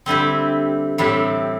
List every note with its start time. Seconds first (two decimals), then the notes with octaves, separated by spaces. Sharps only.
0.06 D3 G3 C4 E4 G4
0.98 A2 E3 G3 C4 G4